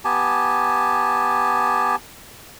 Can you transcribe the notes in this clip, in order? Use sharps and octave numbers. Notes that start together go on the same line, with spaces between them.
B3 G4 G#5 A5